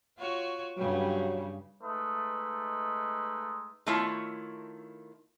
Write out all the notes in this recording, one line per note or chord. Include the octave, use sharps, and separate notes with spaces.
F4 F#4 C#5
G2 C#3 F#3 G3
G#3 A3 D#4 B4 D#6
D#3 A3 E4 F4 C#5